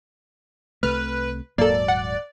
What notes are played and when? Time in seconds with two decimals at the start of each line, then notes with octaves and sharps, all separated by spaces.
0.83 C2 C3 A3 B4 F6
1.58 D#1 G#2 F#3 A#3 A4 D5
1.88 F#5